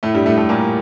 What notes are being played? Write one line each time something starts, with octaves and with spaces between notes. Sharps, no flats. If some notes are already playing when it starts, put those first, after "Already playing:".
A2 A3
G2 G3
A2 A3
A2 A3
A#2 A#3